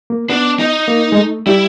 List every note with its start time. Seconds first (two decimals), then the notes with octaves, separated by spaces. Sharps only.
0.10 A#3
0.29 B3 D4
0.59 D#4
0.88 A#3
1.12 G#3
1.17 A3
1.47 G3 E4